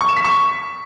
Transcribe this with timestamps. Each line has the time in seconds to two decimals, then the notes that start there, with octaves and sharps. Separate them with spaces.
0.01 C#6
0.09 E7
0.17 B6
0.24 C#6